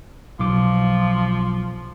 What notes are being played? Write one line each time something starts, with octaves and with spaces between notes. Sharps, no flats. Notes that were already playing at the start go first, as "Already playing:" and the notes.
B1 F3 D6